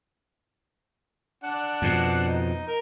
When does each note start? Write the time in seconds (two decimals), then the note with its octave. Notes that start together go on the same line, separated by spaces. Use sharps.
1.44 D4 F#5
1.82 F2 B2
2.28 D#4
2.67 A#4